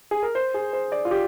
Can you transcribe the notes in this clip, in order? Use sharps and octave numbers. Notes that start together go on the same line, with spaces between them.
G#4
A#4
C5
G#4
C5
D5
F4
G4